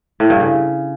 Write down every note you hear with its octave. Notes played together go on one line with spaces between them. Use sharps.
A2
G2
C#3